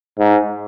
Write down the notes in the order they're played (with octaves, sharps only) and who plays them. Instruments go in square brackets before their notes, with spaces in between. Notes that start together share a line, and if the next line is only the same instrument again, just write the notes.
[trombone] G#2